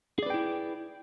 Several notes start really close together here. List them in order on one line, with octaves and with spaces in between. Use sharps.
G#4 D5 B4 G5 E4